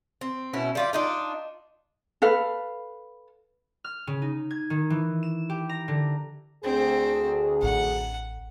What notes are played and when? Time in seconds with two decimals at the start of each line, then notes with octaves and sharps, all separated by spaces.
0.21 C4
0.53 B2 C#4 E4
0.75 G3 F4 D5
0.93 D4 D#4 F4
2.22 A4 B4 F5
3.84 F6
4.07 C#3
4.22 D#4
4.51 G#6
4.70 D#3
4.90 E3
5.23 E7
5.49 G4
5.69 A#5
5.88 D3
6.64 D2 C4 G#4
7.63 A1 F#5